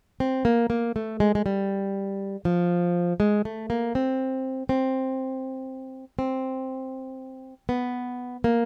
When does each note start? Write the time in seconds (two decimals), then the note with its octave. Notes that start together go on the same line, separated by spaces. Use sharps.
0.20 C4
0.45 A#3
0.70 A#3
0.96 A3
1.20 G#3
1.35 G#3
1.46 G3
2.45 F3
3.20 G#3
3.45 A3
3.70 A#3
3.95 C4
4.69 C4
6.19 C4
7.69 B3
8.44 A#3